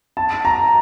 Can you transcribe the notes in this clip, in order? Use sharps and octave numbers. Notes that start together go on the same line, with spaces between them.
A5
A#5